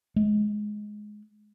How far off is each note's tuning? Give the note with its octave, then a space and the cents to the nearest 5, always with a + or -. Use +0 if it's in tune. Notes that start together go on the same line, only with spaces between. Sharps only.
G#3 +10